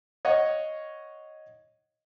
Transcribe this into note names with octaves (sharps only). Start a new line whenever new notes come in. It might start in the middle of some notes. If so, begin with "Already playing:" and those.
C#5 D#5 F5 F#5